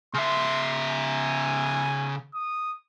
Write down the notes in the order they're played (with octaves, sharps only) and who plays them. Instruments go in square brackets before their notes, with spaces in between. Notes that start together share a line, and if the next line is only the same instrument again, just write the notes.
[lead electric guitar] C#3 E5 [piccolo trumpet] C6
[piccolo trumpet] G#5
D#6